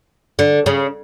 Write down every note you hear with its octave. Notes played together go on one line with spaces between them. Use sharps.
D3
C#3